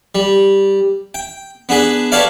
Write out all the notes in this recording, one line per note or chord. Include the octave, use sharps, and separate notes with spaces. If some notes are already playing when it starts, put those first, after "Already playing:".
G3
G5
B3 D4 G#4 B4
G4 A4 B4 C#5 D5 F5